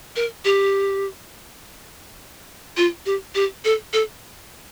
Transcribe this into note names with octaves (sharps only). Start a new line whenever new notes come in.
A#4
G4
F4
G4
G4
A4
A4